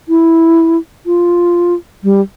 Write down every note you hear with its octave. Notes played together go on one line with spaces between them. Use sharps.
E4
F4
G3